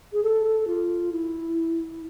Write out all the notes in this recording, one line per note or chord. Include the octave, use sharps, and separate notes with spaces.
G#4
A4
F4
E4